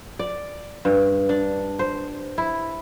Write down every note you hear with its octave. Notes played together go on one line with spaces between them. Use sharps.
D5
G2
D4
C5
E4